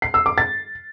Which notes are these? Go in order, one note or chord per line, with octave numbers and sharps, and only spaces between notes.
C7
E6
D6
A6